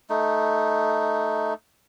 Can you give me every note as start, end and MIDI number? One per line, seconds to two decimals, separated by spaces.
0.10 1.54 57
0.10 1.54 63